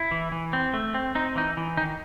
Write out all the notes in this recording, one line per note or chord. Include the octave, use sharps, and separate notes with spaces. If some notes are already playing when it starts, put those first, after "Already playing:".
Already playing: E4
E3
E3
C4
A3
C4
C4 D#4
E3 D#4
E3
D#3 D#4